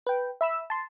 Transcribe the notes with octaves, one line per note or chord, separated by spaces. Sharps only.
B4 G5
E5 B5 E6
A5 C6